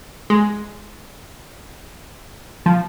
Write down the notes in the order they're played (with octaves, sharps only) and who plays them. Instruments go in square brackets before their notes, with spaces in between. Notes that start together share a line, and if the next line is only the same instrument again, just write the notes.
[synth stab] G#3
F3